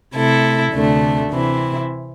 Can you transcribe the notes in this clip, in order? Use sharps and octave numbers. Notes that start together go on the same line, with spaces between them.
C3 A3 E4 A4
D2 C3 A3 D4
C3 E3 C4 E4